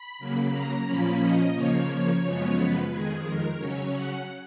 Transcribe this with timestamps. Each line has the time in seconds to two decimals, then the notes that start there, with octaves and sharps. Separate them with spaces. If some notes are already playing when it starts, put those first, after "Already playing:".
Already playing: B5
0.19 C#3 F#3 A#3
0.53 A#5
0.86 A#2 F3 A#3 C#4 B5
1.21 D#5
1.55 C#3 F3 A#3 C#5
2.23 F#2 C#3 F3 G#3 B3
2.56 B4
2.91 F2 D#3 G#3 G#4
3.25 A#4
3.59 C#3 F#3 C#4 C#5
3.93 F#5